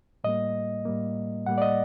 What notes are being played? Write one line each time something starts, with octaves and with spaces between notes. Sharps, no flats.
A2 G3 A#3 D#5
A2 G3 A#3
A2 G3 A#3 F#5
D5
D#5